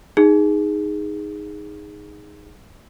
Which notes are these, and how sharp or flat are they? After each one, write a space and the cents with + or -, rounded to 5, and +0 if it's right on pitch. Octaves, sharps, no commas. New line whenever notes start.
D#4 +0 G#4 -10